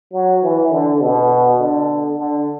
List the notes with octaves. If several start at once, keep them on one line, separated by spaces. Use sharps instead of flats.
F#3
E3
D3
B2
D3
D3